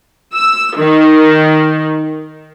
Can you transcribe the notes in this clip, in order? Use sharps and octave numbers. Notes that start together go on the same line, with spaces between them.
E6
D#3